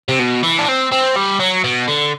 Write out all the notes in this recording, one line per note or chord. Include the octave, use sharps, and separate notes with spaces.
C3
B2
E3
D4
C4
C4
G3
F#3
B2
D3